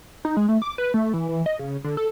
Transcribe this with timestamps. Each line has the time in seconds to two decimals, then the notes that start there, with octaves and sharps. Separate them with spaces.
0.25 D#4
0.37 G#3
0.49 A3
0.62 D6
0.78 B4
0.94 A3
1.13 E3
1.29 E3
1.46 D#5
1.59 C#3
1.84 D3
1.97 A4